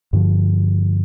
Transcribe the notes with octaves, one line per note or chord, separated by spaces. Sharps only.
G2 D3 F3